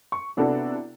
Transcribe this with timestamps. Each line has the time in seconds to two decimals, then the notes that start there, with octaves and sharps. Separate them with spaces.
0.12 C#6
0.37 C3 B3 D4 E4 F#4 A4